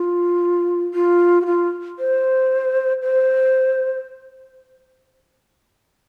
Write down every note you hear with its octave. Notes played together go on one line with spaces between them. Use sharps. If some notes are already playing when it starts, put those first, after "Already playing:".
Already playing: F4
F4
F#4
F4
C5
C5